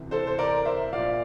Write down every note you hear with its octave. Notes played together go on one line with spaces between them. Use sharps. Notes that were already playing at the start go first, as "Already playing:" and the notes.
Already playing: D2 C3 E3
A4 C5
C5
A#4 D5
C5 E5
A#1 A#2 D5 F5